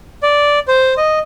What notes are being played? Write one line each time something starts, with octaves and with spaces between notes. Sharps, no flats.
D5
C5
D#5